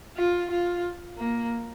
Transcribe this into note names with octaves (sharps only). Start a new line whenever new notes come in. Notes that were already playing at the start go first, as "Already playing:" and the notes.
F4
F4
A#3